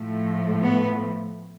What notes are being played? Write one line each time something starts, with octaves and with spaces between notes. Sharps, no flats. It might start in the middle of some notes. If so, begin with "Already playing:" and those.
Already playing: A2 F3 A3
B3